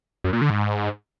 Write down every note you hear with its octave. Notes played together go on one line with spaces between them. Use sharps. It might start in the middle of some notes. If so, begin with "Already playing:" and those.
F#2
A#2
D3
G#2